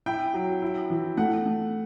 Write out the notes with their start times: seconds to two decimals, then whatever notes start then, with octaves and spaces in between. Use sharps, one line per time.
0.06 E4 G5
0.34 F#3
0.62 E4
0.90 E3
1.17 A3 F#5
1.45 A3